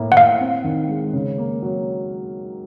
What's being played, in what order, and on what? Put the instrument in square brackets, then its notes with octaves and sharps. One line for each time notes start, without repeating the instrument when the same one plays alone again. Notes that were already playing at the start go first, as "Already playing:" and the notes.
Already playing: [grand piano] A2 A#3
[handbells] F#5
[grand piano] A2 [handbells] F5
[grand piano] C4
D#3
G#3
C#3
A#3
F#3